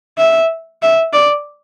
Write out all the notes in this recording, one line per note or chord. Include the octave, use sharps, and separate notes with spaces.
E5
E5
D5